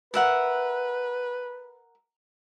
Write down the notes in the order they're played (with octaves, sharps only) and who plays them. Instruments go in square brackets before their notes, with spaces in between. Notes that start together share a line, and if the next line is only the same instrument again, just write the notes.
[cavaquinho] A#4 E5 F#5 [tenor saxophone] B4